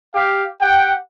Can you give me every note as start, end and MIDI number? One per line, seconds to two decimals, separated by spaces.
0.14 0.44 67
0.14 0.44 77
0.61 0.93 67
0.61 0.93 78
0.61 0.93 79